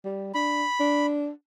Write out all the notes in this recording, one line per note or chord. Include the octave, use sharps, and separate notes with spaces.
G3
D4 B5
D4